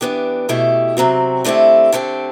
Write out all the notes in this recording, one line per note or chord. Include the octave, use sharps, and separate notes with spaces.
E3 B3 D4 G4
B2 A3 E4 G4
C3 F#3 C4 F#4
D3 A3 C4 E4 G4
D3 A3 C4 G4